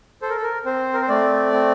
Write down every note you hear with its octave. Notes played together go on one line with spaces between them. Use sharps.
A4 C5
A#4
A4
A#4
C4 C5
A#4
C5
A3 D5
C4